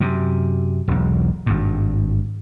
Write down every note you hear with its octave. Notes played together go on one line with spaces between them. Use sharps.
F#2 C3
E1 B1
G#1 G2